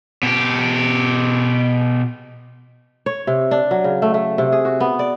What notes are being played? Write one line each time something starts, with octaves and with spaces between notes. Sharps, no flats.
B2 G4
C#5
C3
D4
F#3
C#3
A3
A3
C3
G#4
F#4
B3
D5